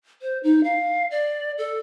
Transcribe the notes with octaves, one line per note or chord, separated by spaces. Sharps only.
C5
D#4
F5
D5
A4